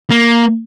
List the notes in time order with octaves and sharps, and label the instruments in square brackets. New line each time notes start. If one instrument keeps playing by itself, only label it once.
[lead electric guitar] A#3